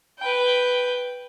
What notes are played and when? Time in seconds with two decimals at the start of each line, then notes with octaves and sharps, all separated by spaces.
0.19 B4 G5